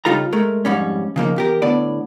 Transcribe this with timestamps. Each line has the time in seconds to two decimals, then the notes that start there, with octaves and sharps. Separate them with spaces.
0.05 C#3 G3 D#4 F4 A4 A#5
0.33 G#3 A3 A#4
0.65 F2 G#2 G3 C#4
1.16 C#3 F3 A#3 D#4
1.36 E2 G4 A#4
1.62 A2 D3 B3 D5